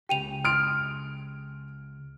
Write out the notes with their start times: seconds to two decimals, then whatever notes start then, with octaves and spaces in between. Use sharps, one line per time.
0.09 C#2 C#3 G4 G5 D#7 F7
0.45 C6 D#6 F6 D7